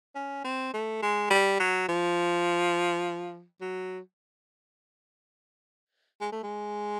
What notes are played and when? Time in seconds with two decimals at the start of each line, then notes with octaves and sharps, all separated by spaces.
0.15 C#4
0.44 C4
0.74 A3
1.02 G#3
1.30 G3
1.60 F#3
1.88 F3
3.61 F#3
6.21 G#3
6.32 A3
6.43 G#3